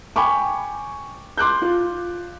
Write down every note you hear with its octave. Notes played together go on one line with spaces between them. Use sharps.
G5 G#5 B5 C#6 D6
C6 D6 F#6 G6
F4